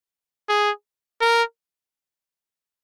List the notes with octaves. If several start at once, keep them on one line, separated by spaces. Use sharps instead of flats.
G#4
A#4